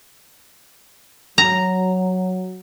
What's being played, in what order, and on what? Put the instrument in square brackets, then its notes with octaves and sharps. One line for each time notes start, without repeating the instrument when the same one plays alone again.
[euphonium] F#3 [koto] A#5